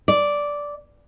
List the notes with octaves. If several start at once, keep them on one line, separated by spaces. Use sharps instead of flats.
D5